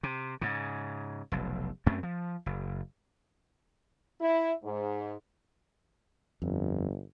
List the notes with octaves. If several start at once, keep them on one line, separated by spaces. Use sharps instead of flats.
C3
G#2 C#3
F1 B1
F#2 A3 C4 C#4
F3
F#1
E4
G#2
G1 F2